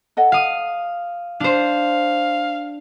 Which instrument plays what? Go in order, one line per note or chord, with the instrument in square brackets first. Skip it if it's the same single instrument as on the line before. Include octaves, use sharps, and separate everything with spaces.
[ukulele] A4 D#5 F#5
[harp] F5 D#6
[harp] D4 C5 [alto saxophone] F5